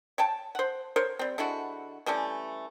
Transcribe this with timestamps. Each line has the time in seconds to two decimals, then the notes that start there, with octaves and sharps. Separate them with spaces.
0.18 C#5 G5 A5
0.55 C5 F#5
0.96 A#4 C5 C#5
1.19 G3 C4
1.38 D3 G#3 E4 F#4
2.06 E3 G3 A3 C#4